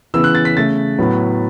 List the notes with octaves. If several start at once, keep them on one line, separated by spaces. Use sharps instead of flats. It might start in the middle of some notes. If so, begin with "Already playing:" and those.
C#3 E3 B3 E6
F#6
A6
B6
C#3 A3 A6
A2 F#3 B3